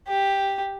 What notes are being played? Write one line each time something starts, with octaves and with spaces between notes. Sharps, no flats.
G4